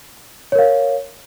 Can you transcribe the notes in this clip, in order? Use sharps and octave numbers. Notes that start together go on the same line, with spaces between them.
A#4 C#5 F5